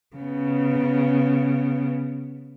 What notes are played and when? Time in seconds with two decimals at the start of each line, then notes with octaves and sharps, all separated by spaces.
0.16 C#3 B3